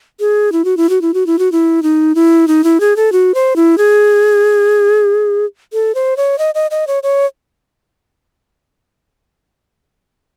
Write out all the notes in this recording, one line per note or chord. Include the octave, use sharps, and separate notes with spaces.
G#4
E4
F#4
E4
F#4
E4
F#4
E4
F#4
E4
D#4
E4
D#4
E4
G#4
A4
F#4
C5
E4
G#4
A4
C5
C#5
D#5
D#5
D#5
C#5
C#5